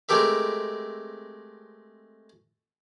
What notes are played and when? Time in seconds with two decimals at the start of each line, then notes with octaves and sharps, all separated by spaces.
0.09 G#3 A3 C4 G4 A#4 E5